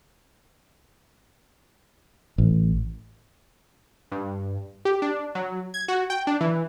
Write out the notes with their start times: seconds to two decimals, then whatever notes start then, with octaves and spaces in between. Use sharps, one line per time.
2.38 A1
4.12 G2
4.85 G4
5.02 D4
5.35 F#3
5.74 G#6
5.88 F#4
6.10 G5
6.27 D4
6.41 E3